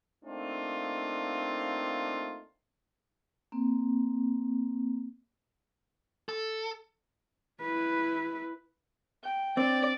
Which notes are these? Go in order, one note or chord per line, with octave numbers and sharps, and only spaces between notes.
A3 A#3 C4 D4 D#4 F4
A#3 C4
A4
E4 B4
G5
C4 D4 D5